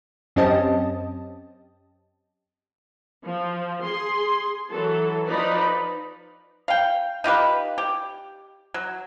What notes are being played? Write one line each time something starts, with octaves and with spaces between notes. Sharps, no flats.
F#2 C4 C#4 G4 D#5 A5
F3
G#4 C6
E3 F#3 A4
F3 D#4 B4 D5 B5
F5 G5
D#4 F4 G4 B4
G4
F#3